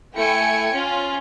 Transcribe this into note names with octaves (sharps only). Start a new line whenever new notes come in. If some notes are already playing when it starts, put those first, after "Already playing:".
A3 E4 G5 G#5 C#7
C#4 F4